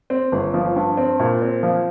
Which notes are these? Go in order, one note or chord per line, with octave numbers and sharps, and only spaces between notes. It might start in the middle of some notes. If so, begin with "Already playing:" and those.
C4
G1
F3
G2
C4
A#2
C4
F3